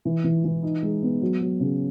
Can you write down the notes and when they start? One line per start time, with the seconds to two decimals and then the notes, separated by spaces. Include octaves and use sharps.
0.05 E3
0.24 E3
0.44 E3
0.63 D#4
0.83 G#3
1.03 B3
1.22 F#3
1.41 F#3
1.60 C#3